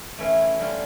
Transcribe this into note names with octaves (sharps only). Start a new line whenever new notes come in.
E3 A3 C#4 E4 F5
D3 G3 C#4 F4